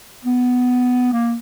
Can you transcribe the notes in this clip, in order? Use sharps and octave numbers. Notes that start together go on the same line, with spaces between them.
B3
A#3